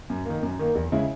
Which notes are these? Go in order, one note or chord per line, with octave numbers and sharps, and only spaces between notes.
F#2
D#3 A#3
F#2
D#3 A#3
E2
C#3 G#3 C#4 E4